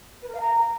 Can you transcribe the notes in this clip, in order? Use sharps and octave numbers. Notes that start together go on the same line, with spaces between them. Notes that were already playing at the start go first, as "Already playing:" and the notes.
B4
A#4
F5
A#5